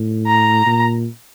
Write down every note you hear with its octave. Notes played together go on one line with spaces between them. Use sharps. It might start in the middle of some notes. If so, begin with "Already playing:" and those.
Already playing: A2
A#5
A#2